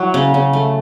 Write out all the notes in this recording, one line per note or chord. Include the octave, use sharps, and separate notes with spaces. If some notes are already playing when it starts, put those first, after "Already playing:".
Already playing: F#3 E4
C#3
C#3
A3